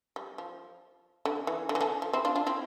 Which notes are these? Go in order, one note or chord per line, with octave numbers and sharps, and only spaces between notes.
G3
F3
D3
E3
D3
E3
D3
F3
C4 E4
D4 F4
D4 F4
C4 E4